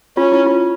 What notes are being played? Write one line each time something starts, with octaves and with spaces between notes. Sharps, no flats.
C#4 F4
E4
F4